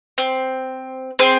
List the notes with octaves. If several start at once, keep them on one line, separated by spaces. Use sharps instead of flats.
C4
C4 G#4